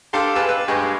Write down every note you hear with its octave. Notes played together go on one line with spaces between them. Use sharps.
D4 G4 A4 F5 C6
G4 G#4 B4 F5 A5 E6
B4
G2 G#3 G4 G#4 C#6